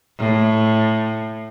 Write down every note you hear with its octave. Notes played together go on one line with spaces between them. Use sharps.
A2